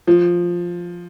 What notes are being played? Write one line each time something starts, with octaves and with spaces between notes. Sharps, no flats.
F3